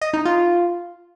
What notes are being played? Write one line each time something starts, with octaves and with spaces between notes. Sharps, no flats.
D#5
D#4
F4